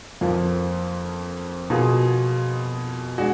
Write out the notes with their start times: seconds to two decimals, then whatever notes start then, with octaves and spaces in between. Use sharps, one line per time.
0.21 F2 F3 A#3 F4
1.70 B2 A#3 F4 G#4
3.18 G#3 D4 F#4